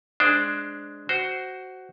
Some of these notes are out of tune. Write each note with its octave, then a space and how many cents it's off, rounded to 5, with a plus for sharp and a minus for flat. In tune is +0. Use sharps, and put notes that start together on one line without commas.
G#3 +0 D4 +0 C5 -5
F#4 +10 C5 +0